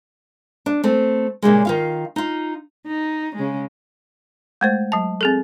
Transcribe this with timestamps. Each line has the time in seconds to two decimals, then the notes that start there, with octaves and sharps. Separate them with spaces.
0.66 D4
0.84 A3 C4
1.42 A#2 C#3 G3 G#3
1.65 D#3 F4 F5
2.16 D#4 F4
2.86 D#4
3.35 C#3 G#3
4.61 G#3 A3 C5
4.92 F#3 A5
5.21 C4 G#4 A4